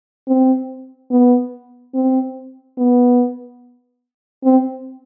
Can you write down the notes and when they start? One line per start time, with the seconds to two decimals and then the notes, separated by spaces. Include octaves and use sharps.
0.28 C4
1.11 B3
1.94 C4
2.78 B3
4.44 C4